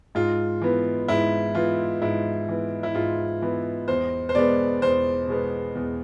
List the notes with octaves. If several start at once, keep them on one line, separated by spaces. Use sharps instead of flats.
G#2 F4
E3 B3
G#2 E4
E3 B3 F4
G#2 E4
E3 B3
E4
G#2 F4
E3 B3
E2 C5
C5
B2 G#3 B3 D5
E2 C5
B2 G#3 B3
E2